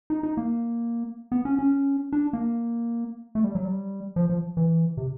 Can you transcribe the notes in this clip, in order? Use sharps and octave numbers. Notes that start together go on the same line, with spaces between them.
D#4
D#4
A#3
B3
C#4
C#4
D4
A#3
A3
G3
F#3
G3
F3
F3
E3
C3